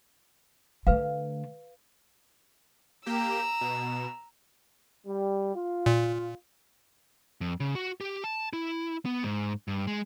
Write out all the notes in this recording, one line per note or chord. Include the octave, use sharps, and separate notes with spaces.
D3 A3 B4 F5
A#3 G4 A#5 E6
B2
G3
F4
A#2
F2
C#3
F#4
G4
A5
E4
B3
G#2
G2
G#3